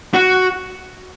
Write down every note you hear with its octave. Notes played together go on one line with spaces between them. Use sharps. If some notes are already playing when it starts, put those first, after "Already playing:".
F#4